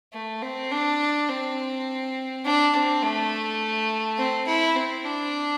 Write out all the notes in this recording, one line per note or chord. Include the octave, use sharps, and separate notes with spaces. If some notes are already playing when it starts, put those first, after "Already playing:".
A3
C4
D4
C4
D4
C4
A3
C4
E4
C4
D4